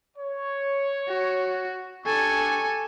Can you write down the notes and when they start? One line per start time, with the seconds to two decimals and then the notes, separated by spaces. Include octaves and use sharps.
0.17 C#5
1.08 F#4
2.06 D4 G4 A4 G#5 C#6